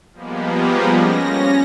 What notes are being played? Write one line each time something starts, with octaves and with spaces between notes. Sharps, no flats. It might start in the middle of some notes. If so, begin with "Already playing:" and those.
F3 G3 G#3 A#3 B3
C#4 A#6